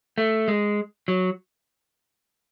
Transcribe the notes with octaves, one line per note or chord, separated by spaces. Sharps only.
A3
G#3
F#3